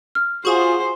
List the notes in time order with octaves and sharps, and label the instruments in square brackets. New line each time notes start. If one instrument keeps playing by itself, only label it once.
[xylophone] F6
[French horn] F4 [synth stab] F#4 G#4 [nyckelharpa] C5